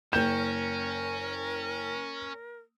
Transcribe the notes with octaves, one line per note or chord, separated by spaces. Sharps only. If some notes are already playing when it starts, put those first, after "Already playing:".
F#1 C#4 A#4 G5 G6 E7